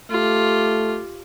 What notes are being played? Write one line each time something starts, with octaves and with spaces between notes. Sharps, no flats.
A3 F4 G4